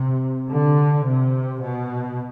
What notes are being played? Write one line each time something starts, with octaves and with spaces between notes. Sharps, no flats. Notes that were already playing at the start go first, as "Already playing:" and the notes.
Already playing: C3
D3
C3
B2